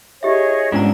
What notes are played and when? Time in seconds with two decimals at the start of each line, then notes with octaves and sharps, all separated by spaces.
0.23 E4 G4 G#4 C#5 D#5 E5
0.72 G#2 B3 C#4 D4 F4 A#5